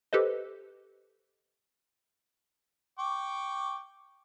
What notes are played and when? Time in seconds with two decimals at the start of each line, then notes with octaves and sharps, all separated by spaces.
0.13 G4 A4 B4 C5 D#5
2.99 G5 C#6 D6